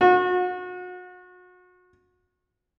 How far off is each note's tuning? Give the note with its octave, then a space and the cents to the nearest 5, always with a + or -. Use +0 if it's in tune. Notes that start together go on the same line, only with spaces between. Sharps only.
F#4 -35